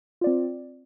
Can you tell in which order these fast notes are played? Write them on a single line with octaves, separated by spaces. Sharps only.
F4 D5 C4